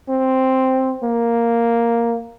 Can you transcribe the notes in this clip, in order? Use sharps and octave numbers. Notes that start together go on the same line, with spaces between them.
C4
A#3